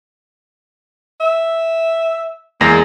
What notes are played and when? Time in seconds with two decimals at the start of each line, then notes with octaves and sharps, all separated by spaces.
1.21 E5
2.61 E2 G#3 A#3 A#6